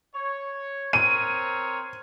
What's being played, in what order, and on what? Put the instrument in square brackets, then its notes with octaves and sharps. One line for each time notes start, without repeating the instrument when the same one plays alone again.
[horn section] C#5
[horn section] C4 A#4 C#5 [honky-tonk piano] D#7